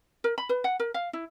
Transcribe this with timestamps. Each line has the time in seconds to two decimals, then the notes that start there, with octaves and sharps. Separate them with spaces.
0.24 A#4
0.38 B5
0.49 B4
0.64 F#5
0.80 A#4
0.94 F5
1.13 E4